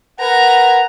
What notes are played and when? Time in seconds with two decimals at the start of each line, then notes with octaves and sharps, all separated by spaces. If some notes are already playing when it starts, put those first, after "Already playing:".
0.20 A#4 B4 F#5 G#5 A#5